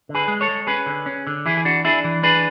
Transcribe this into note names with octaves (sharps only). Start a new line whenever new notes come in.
D3
G#4 B4
G#3
A4 C#5
G#3
C#4 G#4 B4
D3
C#4
D3
E3 E4 G#4
G#4
D4 F#4
D4 E4 G#4
E3
D4 G#4 B4